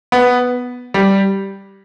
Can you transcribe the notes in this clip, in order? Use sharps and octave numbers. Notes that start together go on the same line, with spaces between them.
B3
G3